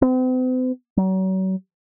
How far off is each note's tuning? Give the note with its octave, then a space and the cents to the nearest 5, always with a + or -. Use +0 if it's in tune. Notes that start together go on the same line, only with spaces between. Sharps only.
C4 -45
F#3 +35